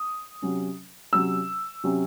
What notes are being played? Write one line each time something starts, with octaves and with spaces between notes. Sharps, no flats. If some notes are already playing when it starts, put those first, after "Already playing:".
Already playing: D#6
C3 F#3 C#4
C3 F#3 C#4 E6
C3 F#3 C#4